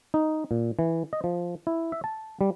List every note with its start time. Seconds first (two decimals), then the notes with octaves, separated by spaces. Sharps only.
0.14 D#4
0.51 A#2
0.79 E3
1.13 D#5
1.24 F3
1.67 E4
1.92 E5
2.04 A5
2.41 G3